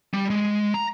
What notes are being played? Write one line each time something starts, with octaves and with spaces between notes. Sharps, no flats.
G3
G#3
A#5